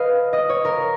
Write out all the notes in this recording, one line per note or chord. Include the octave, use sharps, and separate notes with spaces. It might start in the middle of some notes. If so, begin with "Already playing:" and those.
Already playing: B4 D#5 F5
D#5
C#5
A#4